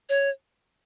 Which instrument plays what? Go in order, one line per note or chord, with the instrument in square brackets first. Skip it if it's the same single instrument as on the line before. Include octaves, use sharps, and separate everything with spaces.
[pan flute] C#5